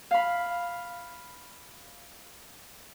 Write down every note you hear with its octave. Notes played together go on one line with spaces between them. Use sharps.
F5 B5